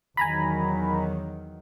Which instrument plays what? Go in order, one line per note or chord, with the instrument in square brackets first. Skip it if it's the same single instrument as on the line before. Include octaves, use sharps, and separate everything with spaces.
[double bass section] E2 D#3 F#3 [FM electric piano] G#5 A#5 B5